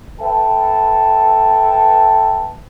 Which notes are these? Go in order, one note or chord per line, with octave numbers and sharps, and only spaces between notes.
A4 B4 E5 G5 A5